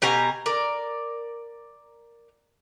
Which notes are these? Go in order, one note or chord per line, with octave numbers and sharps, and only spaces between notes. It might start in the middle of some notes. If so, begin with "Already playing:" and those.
B2 G4 G#5 A#5
A#4 D5